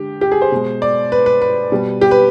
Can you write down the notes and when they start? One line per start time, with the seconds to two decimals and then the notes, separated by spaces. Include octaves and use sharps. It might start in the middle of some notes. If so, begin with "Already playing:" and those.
Already playing: D3 G#3 G4
0.21 G4
0.32 G#4
0.42 C5
0.52 B2 G#3
0.82 D5
1.12 B4
1.26 B4
1.42 B4
1.72 B2 G3
2.01 G4
2.11 B4